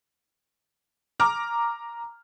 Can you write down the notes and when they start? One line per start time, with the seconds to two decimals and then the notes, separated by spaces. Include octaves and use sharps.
1.20 A#5 D6 F6